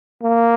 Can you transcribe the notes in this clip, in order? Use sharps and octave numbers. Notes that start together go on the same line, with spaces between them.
A#3